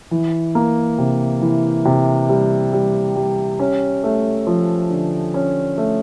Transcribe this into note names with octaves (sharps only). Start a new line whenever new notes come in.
E3
A#3
C3
E3
C3
G3
G3
G3
C#4
A3
F3
D3
C#4
A3